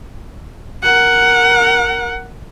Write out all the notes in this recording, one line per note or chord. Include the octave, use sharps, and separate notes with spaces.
A#4 F#5